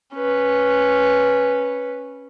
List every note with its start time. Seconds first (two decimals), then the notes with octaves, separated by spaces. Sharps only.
0.14 C#4 B4